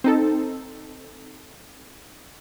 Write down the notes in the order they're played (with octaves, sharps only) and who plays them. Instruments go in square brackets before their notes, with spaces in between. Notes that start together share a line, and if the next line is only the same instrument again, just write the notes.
[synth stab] C4 D#4 A4